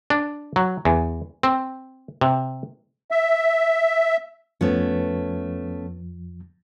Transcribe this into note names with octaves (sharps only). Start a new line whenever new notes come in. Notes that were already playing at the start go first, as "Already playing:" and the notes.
D4
F#3
E2
C4
C3
E5
F2 F3 A3 B3 C#4